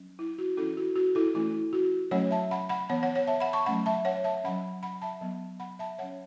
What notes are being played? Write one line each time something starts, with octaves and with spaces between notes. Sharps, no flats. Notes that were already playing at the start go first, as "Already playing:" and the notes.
Already playing: F#3 C#4
E4
F#4
E3 C#4 E4 A4
F#4
F#4
E4 A4
E3 A3 C#4 E4
F#4
F#3 A3 C#4 C#5 F#5
E5 A5
F#5 B5
F#5 B5
E3 B3 C#5 F#5
C#5 F#5
C#5 F#5
E5 A5
F#5 B5
A5 C#6
F#3 A3 C#4 F#5 B5
E5 A5
C#5 F#5
E5 A5
F#3 C#4 F#5 B5
F#5 B5
E5 A5
F#3 B3
F#5 B5
E5 A5
F#3 C#4 C#5 F#5